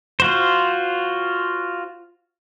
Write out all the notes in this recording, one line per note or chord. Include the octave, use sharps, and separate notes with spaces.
F4 F#4 C5